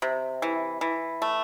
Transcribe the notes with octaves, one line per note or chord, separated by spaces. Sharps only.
C3
E3
E3
A3